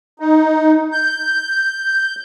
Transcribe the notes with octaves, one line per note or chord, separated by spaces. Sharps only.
D#4
G6